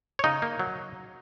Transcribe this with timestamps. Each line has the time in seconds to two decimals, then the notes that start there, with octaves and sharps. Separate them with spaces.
0.19 C#5
0.24 C#3 D#4 D#5
0.42 A#3
0.59 F#3